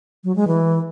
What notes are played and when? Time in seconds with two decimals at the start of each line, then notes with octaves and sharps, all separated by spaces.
0.24 F#3
0.36 G#3
0.47 E3